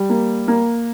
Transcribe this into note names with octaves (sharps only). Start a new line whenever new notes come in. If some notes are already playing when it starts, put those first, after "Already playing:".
Already playing: G3
A#3
A#3